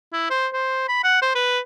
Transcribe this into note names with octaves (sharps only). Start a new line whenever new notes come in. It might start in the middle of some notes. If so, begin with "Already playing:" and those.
E4
C5
C5
B5
F#5
C5
B4